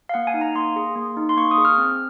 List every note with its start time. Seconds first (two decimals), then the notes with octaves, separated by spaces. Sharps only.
0.09 F5
0.14 A#3 F#5
0.27 G#5
0.34 D#4
0.41 A#5
0.55 A#3 C6
0.76 G#4
0.96 A#3
1.17 D#4
1.29 C6
1.37 A#3 C#6
1.51 D#6
1.58 G#4
1.65 F6
1.78 C4